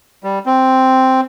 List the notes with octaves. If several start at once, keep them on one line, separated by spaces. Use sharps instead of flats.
G3
C4